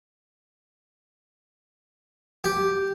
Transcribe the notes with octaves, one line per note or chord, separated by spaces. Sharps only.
G4